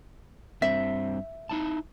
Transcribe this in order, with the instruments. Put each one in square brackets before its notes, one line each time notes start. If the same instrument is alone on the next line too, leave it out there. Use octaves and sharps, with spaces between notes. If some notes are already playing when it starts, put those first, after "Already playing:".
[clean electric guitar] G2 C4 [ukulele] E5
[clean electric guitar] D#4 E4 A5